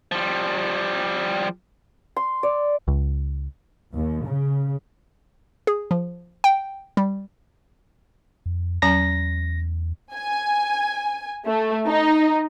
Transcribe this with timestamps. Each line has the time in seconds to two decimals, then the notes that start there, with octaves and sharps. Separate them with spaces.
0.12 F3 G3
2.16 C6
2.43 D5
2.88 C#2
3.96 D#2
4.27 C#3
5.67 G#4
5.91 F3
6.44 G5
6.97 G3
8.46 F2
8.82 E2 F#3 C#4 A#5 A#6
10.14 G#5
11.47 A3
11.88 D#4